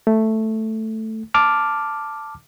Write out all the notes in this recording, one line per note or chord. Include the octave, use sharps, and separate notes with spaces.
A3
A5 D6 F6